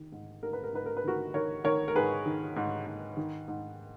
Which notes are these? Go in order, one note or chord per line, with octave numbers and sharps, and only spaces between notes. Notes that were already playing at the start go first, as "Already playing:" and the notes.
Already playing: D#3
G#2
G#2 A#4
B4
A#4
G#2 B4
A#4
B4
D#3 F#4 A#4
D#3 A#4 C#5
D#3 A#4 C#5
A#4
G#2 G#4 B4
D#3
G#2
G#2
D#3
G#2